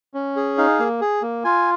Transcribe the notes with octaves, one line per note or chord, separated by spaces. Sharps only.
C#4
G#4
D#4 F5
A#3
G#4
A#3
F4 G#5